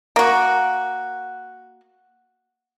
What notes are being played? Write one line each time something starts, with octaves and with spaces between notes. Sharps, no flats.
A#3 F#4